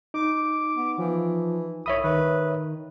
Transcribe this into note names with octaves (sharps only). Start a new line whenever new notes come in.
D#4 D6
B3
E3 F3
C2 C#5 E5 B5 D#6
D#3 B4